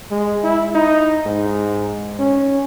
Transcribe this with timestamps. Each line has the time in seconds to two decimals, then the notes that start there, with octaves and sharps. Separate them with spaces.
0.11 G#3
0.44 E4
0.75 D#4
1.26 G#2
2.19 C#4